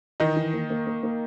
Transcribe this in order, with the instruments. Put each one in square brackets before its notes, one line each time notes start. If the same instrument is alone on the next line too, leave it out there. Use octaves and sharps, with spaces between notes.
[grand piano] D#3 D#4 [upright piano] E3
[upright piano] E3
A#3
A#3
A#3
A#3